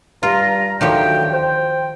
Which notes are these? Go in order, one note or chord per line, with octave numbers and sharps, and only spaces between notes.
G2 F4 A#5
D2 D#3 F3 F#3 G4 G5
C5 G5